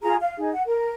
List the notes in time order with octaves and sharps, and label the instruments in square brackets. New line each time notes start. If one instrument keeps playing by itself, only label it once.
[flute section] F4 G#4 A#5
F5
D#4 G#4
F#5
A#4